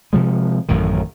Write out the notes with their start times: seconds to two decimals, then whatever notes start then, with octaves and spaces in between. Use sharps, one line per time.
0.13 C3 F3 G#3
0.69 A1 F#2 A2 D#3